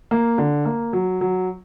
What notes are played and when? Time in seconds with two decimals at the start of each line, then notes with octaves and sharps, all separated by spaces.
0.11 A#3
0.38 D3
0.65 A#3
0.93 F#3
1.21 F#3